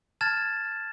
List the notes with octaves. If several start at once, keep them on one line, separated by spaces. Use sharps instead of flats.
A5 F6 G#6 A6 E7